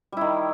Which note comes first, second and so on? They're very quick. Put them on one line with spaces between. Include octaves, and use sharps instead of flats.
G3 E4 D#3